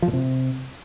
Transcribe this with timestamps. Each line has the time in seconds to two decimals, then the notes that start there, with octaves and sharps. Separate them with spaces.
0.02 F3
0.08 A#2
0.13 C3